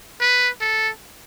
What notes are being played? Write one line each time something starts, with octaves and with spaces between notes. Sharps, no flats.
B4
A4